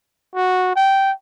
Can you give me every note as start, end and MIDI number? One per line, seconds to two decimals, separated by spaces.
0.35 0.73 66
0.76 1.12 79